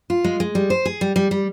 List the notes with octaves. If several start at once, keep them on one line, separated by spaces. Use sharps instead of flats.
F4
G#3
G#3
G3
C5
G#4
G3
G3
G3